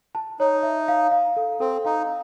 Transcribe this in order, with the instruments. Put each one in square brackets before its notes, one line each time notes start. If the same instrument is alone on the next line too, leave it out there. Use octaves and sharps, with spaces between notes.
[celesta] A5
[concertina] D#4 [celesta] C#5
[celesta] E5
F5
F5
A4
[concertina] C4 [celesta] A4
[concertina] D#4 [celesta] F5